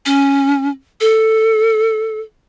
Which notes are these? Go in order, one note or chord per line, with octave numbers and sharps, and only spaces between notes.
C#4
A4